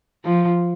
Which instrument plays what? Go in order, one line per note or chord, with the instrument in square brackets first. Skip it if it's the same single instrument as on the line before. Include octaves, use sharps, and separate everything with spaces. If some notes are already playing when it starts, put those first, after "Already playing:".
[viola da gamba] F3